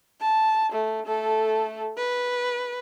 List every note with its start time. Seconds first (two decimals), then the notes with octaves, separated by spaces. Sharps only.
0.21 A5
0.72 A3
1.06 A3 A4
1.97 B4